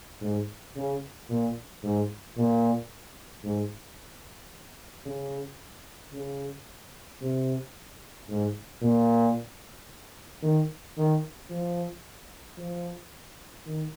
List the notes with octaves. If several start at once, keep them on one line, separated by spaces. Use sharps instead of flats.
G#2
C#3
A#2
G#2
A#2
G#2
C#3
C#3
C3
G#2
A#2
D#3
D#3
F3
F3
D#3